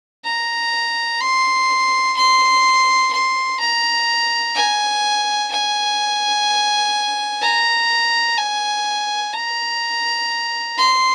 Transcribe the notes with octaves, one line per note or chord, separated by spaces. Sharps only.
A#5
C6
C6
C6
A#5
G#5
G#5
A#5
G#5
A#5
C6